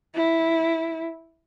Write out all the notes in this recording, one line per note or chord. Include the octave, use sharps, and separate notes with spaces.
E4